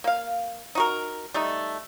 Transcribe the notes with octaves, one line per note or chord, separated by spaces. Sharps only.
A#3 F5
D#4 F#4 A#4
G3 A3 D#4